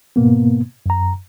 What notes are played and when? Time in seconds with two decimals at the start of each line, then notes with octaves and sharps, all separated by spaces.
0.16 G#2 B2 A#3 B3
0.86 F#2 A#5